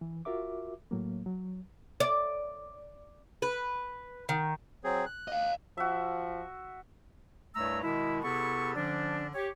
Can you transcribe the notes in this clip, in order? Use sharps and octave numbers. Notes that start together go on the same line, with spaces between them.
E3
F4 F#4 A#4 E5 D6
A2 F#3 A#3
F#3
D5
B4
D#3
F#3 C4 G#4
F#6
D#5 F5
F3 F#4 E5
C2 G2 A3 C#5 A#5 E6
B2 D#3 G#3 E4
C3 B3 E4 G#4 A4 C#6
D3 F3 C#4 D4
G4 C#5